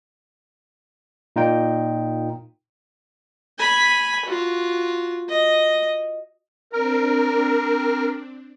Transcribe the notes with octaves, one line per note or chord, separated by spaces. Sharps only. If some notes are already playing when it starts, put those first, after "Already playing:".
A#2 D#4 F4 G5
G#5 B5
F4 F#4
D#5
C4 D4 A#4